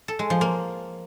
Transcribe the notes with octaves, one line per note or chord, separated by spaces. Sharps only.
A4
G#3
F3
A#3